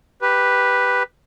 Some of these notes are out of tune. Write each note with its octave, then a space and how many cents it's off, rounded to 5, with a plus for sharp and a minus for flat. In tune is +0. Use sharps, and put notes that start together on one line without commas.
G4 +0 B4 +0